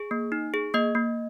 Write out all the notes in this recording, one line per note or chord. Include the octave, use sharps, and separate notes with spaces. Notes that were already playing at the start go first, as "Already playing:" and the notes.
Already playing: G#4
A#3
D#4
G#4
A#3 D#5
A#3